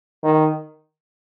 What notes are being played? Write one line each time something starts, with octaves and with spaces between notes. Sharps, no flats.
D#3